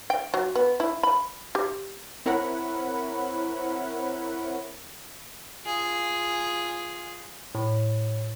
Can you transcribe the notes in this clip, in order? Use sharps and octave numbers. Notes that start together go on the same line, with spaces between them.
G5
F#3
B3
E4
B5
G4
C4 E4 A#4 C#5 F#5 B5
F4 G#4
A2